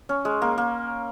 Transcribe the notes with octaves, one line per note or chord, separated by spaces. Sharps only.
C#4
G#3
A#3
A#3